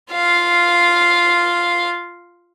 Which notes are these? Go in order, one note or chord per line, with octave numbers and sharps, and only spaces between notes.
F4 F5